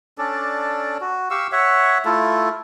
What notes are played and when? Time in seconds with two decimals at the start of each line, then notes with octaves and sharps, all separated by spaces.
0.18 C#4 D4 A4 D5
1.01 F#4
1.30 G4 F5 C#6 E6
1.52 C#5 E5 F#5
2.05 A3 E4 F4 A4